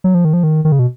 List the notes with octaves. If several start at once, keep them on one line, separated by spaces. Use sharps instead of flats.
F#3
F3
D#3
F3
D#3
D#3
C#3
B2